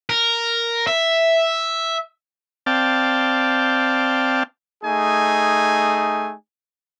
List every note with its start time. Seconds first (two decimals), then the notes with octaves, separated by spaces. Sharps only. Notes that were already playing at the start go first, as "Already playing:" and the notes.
0.10 A#4
0.87 E5
2.66 C4 D5 F5 G5 A5
4.84 A3 D#4 G#4 G#5